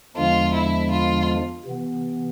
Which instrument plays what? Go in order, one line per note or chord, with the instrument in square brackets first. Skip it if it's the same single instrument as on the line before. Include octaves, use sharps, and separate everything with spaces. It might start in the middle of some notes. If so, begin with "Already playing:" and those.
[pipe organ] E2 D3 F3 G#3 D4 [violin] F4
[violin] E4
F4
[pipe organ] C3 E3 B3